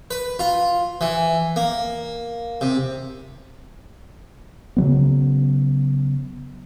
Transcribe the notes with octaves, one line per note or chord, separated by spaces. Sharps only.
B4
F4
E3
A#3
C3
C#3 F#3 B3